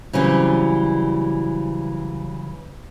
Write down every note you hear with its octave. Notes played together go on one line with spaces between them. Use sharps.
C#3 E3 F#3 G3 C4